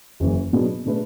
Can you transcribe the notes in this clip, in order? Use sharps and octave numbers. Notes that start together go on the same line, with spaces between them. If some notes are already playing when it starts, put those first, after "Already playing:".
F#1 F#2 E3
B2 F#3 B3 D4 G#4
B2 A3 D4 G#4 B4